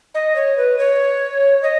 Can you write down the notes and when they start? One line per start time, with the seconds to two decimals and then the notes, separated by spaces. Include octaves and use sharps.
0.15 D#5
0.36 C#5
0.57 B4
0.78 C#5
1.63 D#5